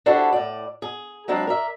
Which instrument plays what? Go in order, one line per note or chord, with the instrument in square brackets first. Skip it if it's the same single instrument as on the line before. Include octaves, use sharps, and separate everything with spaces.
[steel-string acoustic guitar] D4 E4 F#4 G4 A4 C5
A2 D5
G#4
F#3 G#3 C4 D4 E4
A#4 D5 E5